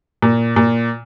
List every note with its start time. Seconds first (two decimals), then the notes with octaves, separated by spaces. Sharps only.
0.22 A#2
0.56 A#2